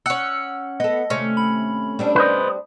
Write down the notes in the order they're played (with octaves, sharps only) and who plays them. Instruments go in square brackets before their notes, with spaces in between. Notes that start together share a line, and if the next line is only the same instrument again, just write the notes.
[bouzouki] C#4 F#5 [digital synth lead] E6
[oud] B3 A4 [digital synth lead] D#5
[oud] D#2 C3 A3 [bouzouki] C#4
[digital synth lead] B5
[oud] G3 C4 D4
[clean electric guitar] B4 C5 D#5